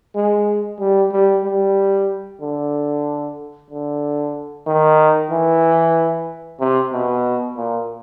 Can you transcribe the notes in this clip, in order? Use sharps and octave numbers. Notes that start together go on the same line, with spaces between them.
G#3
G3
G3
G3
D3
D3
D#3
E3
C3
B2
A#2